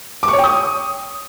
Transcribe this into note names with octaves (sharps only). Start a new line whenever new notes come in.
D6
C#6
C#5
G5
D#6